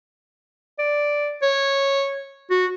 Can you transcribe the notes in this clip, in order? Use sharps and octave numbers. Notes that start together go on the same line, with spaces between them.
D5
C#5
F#4